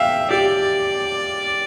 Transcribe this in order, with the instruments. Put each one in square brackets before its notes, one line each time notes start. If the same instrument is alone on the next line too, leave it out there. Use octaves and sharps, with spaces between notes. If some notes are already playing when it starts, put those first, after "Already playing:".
Already playing: [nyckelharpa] E5 [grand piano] F5 G5
[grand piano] G4 [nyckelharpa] D5